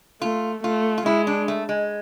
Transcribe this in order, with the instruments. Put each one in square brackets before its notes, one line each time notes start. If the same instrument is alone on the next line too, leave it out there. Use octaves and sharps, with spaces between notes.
[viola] A3 [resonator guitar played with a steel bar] F4
[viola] A3 [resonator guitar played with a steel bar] F4
[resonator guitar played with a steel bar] F4
[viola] G#3 [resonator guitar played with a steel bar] E4
[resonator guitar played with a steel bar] D4
A3
G#3